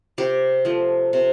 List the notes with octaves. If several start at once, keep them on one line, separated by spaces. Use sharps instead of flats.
C3 G4
F3 A3
C3